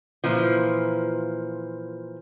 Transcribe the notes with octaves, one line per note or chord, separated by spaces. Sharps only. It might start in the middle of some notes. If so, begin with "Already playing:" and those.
A#2 E3 F3